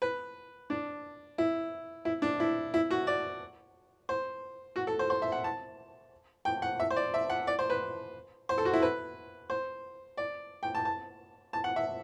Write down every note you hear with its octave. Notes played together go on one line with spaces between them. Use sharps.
B4
D4
E4
E4
D4
E4
E4
F#4
D5
C5
F#4
A4
C5
C5
E5
F#5
A5
G5
F#5
E5
C5
D5
E5
F#5
D5
C5
B4
C5
A4
F#4
E4
B4
C5
D5
G5
A5
A5
A5
F#5
E5